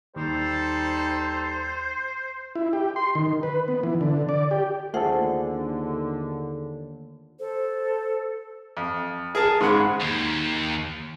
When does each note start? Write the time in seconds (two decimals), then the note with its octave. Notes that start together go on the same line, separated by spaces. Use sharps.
0.16 D#2 G3 D#4 A4 C5
2.55 E4
2.73 G4
2.96 C6
3.15 D#3
3.43 B4
3.68 B3
3.83 E3
4.01 D3
4.29 D5
4.51 G4
4.94 D#2 D3 A3 F4 G#4 A4 C5 F#5
7.39 A4 C5
8.77 F2
9.35 G#4 A#4 A5
9.61 G#2 C#3 G#4 F#5 B5
10.00 D#2